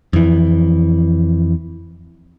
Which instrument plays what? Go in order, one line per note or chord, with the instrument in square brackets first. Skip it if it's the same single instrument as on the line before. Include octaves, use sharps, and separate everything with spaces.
[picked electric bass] F2 E3